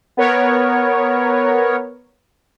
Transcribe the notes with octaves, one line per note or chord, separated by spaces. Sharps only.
B3 A#4 C#5